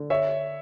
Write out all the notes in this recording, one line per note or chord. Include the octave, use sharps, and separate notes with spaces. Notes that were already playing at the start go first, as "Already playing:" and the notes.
Already playing: D3
C#5 E5